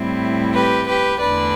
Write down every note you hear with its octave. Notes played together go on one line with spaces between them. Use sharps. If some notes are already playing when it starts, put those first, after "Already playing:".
Already playing: A2 G3 C4 E4
G4 B4
G4 B4
E2 D3 A3 D4 B4 D5